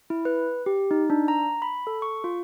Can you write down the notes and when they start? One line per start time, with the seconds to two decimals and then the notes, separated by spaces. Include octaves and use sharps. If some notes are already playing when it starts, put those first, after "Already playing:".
0.10 E4
0.25 B4
0.66 G4
0.91 D#4
1.10 D4
1.28 A#5
1.62 B5
1.87 A4
2.02 C#6
2.24 F4